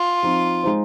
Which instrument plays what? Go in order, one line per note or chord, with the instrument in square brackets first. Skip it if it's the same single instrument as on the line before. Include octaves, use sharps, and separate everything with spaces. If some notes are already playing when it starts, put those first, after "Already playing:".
Already playing: [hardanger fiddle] F4
[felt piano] F3 C4 D#4
G#3 D#4 C5